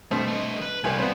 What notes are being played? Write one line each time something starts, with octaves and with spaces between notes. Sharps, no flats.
G2 B2 A3 C4
A3 D#5
B4
C2 G3 F4 B4 G#5
B3 C4